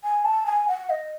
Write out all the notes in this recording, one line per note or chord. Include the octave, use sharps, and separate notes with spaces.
G#5
A5
G#5
F#5
D#5